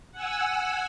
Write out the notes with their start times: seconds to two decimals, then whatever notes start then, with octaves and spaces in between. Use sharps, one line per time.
0.12 F#5 G#5 E6